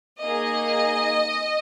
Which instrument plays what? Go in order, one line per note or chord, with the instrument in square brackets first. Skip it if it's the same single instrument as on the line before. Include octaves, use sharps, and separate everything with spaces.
[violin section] A#3 D#4 G#4 D#5